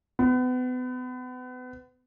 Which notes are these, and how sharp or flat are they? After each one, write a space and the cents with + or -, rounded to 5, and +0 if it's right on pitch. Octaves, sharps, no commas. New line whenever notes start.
B3 +35